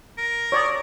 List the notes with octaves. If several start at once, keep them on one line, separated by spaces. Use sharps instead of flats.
A#4
C#5 D5 C#6 D#6